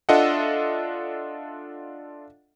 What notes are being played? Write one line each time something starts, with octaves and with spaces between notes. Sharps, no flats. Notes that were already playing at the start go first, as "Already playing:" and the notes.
D4 F4 A4 D#5 E5 F#5